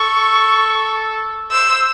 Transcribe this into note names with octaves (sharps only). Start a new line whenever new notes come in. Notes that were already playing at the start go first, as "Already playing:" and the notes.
Already playing: A4 C#6
C5 E6
C5